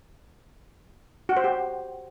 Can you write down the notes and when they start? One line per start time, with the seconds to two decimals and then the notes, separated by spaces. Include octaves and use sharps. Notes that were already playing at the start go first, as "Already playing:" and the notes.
1.29 F#4
1.37 C5
1.44 G4